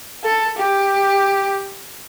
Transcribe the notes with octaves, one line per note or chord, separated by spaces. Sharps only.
A4
G4